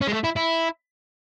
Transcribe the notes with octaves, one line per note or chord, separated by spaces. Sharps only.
C#4
G#3
A3
E4
E4